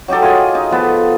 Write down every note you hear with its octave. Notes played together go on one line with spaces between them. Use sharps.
F#3 D#4 G4 A4
F4 G#4 D#5 G#5
D#4
F3 B3 A4